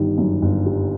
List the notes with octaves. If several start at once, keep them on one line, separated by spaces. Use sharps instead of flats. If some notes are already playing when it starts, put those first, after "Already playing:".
Already playing: G1 D#3 G3
F#2
G1
G3